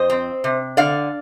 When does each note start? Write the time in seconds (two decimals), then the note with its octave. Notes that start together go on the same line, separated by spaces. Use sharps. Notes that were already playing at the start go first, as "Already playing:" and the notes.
Already playing: F2 C5 D#5
0.10 C4
0.44 C3
0.77 D3 D5 F5